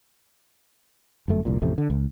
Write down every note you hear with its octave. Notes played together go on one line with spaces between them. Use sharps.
G1 F#2 A3
F1 C2 A#2
A1 F2 C3 A3
D3
C#2